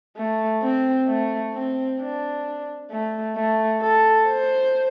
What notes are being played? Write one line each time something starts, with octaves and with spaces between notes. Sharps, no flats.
A3
C4
A3
C4
D4
A3
A3
A4
C5